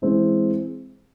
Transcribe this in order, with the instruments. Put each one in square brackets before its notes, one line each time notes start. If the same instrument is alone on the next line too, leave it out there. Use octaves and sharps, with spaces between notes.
[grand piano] E3 G#3 C4 E4